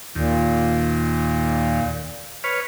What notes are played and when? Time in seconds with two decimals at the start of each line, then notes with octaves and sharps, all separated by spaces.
0.15 D#2 A#2
2.44 B4 C#5 F6